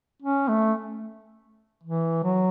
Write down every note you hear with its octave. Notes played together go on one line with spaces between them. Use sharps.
C#4
A3
E3
F#3